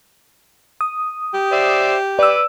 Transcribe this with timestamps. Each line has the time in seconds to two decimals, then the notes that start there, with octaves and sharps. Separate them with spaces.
0.81 D#6
1.34 G4
1.52 C5 D5 E5
2.19 B4 D5 D6 E6